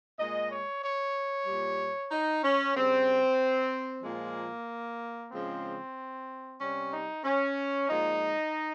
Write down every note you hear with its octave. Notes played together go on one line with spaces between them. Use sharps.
A#2 G#3 D#5
C#5
C#5
A#2 G3
D#4
C#4
C#3 G3 C4
A#2 F3 G#3 A#3
C#3 F3 G#3 C4
C3 G3 C#4
D#4
C#4
A#2 F3 G#3 D#4